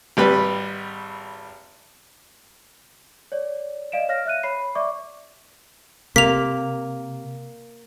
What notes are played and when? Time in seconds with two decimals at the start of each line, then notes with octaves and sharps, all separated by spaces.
0.17 G#1 G3 B4
3.32 C#5 D5
3.92 D5 D#5 F5 D7 E7
4.09 C#5 F5 F6 A#6
4.25 E5 F#6 D#7
4.43 C#5 B5 C7
4.75 D5 E5 C#6 D6
6.16 C3 A#3 B6 F7